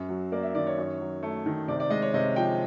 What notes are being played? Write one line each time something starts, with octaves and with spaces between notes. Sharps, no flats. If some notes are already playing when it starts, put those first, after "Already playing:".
Already playing: F#2
F#3
A#3 D5
E5
D#3 D5
C#5
F#2
F#3
A3
D#3
C3 D5
D5
G#3 D#5
C#5
C3 D#5
F3 G5